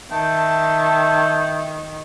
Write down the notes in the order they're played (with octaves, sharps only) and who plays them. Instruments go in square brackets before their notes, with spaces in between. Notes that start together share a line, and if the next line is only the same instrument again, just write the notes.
[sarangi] D#3 [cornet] E5 [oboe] G5 [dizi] A5